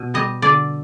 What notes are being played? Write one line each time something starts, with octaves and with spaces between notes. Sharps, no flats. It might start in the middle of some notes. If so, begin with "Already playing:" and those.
Already playing: B2
G3 D#5
D3 D5